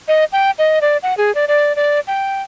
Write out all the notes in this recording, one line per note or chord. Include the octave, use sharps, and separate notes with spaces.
D#5
G5
D#5
D5
F#5
G#4
D5
D5
D5
G5